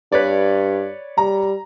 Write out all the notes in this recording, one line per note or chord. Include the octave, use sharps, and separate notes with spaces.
G2 B4 C#5 D5
G3 A#5